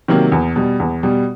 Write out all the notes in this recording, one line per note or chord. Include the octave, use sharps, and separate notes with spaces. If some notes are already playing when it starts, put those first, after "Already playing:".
C3 D#3 F#3 A#3
E2
B2 G3
E2
B2 G3